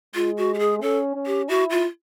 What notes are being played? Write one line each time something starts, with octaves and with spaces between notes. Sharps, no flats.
G#3 F4
F#4
G4
G#4
C#4 A4
C#4
G4
E4 F#4
F4